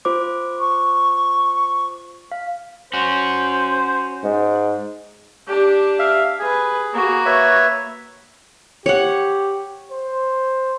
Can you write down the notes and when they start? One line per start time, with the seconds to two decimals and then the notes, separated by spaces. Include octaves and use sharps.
0.05 F4 C5 D6
0.59 C#6
2.32 F5
2.93 C#4 F#4 C5
4.23 G#2
5.47 D4 G4
5.99 E5 F5
6.40 G#4 B4 G#5
6.93 A#3 F#4
7.26 B4 C#5 E5
8.86 G4 C#5 F#5
9.92 C5